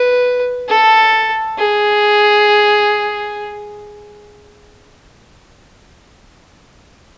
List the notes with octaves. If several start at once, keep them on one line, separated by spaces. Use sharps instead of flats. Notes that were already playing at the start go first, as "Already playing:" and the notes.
Already playing: B4
A4
G#4